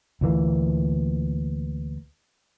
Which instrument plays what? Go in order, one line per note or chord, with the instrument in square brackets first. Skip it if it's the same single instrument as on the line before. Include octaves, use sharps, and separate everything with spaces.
[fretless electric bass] D2 A#2 E3 A#3